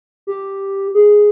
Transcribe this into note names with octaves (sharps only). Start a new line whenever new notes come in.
G4
G#4